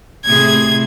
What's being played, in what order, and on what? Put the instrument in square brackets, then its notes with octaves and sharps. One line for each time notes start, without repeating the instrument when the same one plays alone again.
[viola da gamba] A2 C3 G#4 [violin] G#6